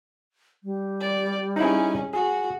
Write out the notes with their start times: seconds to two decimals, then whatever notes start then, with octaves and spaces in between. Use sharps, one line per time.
0.64 G3
1.00 D5
1.56 C#4 D#4 E4 G#4
2.13 F#4 G#4